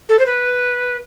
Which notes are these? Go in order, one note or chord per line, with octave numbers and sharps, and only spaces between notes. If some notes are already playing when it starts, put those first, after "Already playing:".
A4
C5
B4